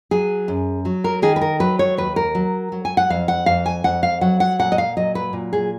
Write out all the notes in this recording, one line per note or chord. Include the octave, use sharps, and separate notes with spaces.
F#3 G#4
F#2
F#3
A#4
D#3 G#4
B4
A#4
F#3 B4
C#5
D#2 B4
A#4
F#3
F#3
G#5
F#5
F2 F5
F#5
F2 F5
G#5
F2 F#5
F5
F#3 F#5
F#5
A#2 F#5
D#5
F5
F#3 D#5
B4
A#2
G#4